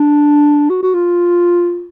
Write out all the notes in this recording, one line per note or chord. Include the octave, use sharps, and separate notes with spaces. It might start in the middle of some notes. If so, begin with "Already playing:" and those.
Already playing: D4
F#4
F#4
F4